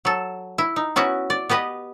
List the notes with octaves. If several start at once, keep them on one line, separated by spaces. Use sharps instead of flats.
F#3 A4
E4
D#4
B3 C#4 E4 F#4
D5
B3 G4 B4 D#5